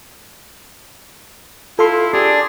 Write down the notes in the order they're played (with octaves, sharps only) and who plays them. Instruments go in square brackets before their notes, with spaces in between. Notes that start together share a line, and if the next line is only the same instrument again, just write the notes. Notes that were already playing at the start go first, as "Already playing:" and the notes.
[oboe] E4 [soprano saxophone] F4 [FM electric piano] A4 C6
[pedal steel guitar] D4 [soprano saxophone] G4 [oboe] G#4